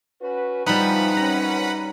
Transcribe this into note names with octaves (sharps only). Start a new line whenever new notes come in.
C#4 F#4 B4
C3 E3 F3 G3 D#4 B4 F#5 B5
F#2 C3 C#4 A#5